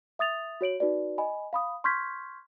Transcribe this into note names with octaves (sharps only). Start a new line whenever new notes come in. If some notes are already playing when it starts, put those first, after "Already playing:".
E5 D#6 A6 F7
F#4 C#5 D7 F#7
D#4 F#4 B4 D5
D#5 G#5 B5
F5 B5 D#6
C6 C#6 F6 G6 G#6 B6